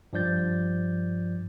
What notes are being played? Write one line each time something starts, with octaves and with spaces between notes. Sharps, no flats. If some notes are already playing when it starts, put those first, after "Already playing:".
G2 F3 D5 G6 A6